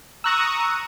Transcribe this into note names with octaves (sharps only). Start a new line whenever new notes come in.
A#5 C#6 D#6 E6 F#6 A#6